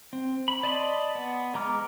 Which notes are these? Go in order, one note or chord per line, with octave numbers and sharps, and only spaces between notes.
C4
B5
D5 D#5 A5 B5 C6
B3
G#3 A#5 D6 F6